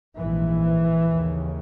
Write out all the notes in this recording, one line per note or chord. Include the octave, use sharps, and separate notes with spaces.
A#1 G#2 E3
D#2 C#3